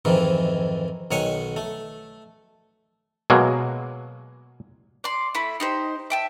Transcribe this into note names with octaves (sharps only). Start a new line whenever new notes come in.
F2 G#2 D#3 E3
B1 D#3 C#5 F#5 G#5
A3
B2 F#3 G#3 A#3
D5 C6
A3 E4 B5
D#4 G4 C5
E5 G5 A5